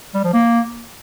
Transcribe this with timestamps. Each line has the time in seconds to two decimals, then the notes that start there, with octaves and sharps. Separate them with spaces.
0.14 G3
0.24 F3
0.34 A#3